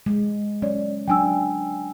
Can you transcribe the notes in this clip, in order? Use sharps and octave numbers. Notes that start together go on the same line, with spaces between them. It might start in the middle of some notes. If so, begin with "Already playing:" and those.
G#3
F#3 C#4 C#5 D5
F#3 D4 G5 G#5 E6